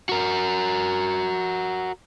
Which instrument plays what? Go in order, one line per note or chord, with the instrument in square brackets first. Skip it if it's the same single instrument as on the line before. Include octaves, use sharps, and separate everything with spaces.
[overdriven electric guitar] F#4 A#4